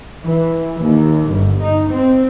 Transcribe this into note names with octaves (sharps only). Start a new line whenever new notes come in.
E3
D#2
G1
D#4
C4